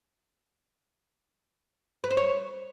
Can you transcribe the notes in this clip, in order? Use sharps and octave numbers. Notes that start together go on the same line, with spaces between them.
B4
C5
C#5